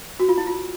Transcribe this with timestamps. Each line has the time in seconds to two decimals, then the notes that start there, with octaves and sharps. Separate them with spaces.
0.20 F#4
0.29 F4
0.38 E4
0.47 F4